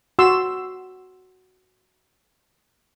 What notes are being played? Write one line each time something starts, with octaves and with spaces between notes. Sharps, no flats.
F#4 C6 E6